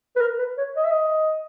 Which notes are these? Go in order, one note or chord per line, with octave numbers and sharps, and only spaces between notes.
B4
A#4
B4
C#5
D#5
E5
D#5